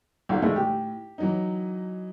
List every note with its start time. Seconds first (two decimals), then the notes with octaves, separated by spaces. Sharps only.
0.29 B1 F4
0.42 A2 G#3 A3 E4
0.56 G4
1.18 E3 F#3 D#4